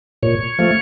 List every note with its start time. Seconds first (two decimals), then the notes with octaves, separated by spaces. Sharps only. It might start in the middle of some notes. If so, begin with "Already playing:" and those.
0.23 A#2 C#5
0.59 F3 A3